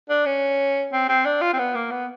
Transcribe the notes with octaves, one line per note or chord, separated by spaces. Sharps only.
D4
C#4
C4
C4
D4
F4
C4
B3
A#3
B3